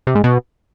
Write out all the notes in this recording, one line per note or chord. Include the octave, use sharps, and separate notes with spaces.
C3
G#2
B2